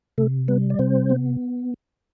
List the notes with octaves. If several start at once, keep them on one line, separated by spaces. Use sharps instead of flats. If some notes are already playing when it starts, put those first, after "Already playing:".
C3 A3 A4
G3 B3 B4
D5
C3 C4 C5
B3